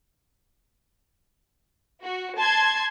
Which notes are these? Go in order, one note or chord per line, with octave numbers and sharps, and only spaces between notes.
F#4
A5 C6 G#6